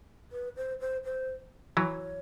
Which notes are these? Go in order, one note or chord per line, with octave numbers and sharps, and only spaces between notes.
B4
C5
C5
C5
E3 F#3 C#5